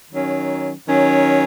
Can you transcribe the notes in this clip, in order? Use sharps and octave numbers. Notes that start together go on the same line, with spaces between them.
D#3 F#3 C#4
D#3 F#3 C#4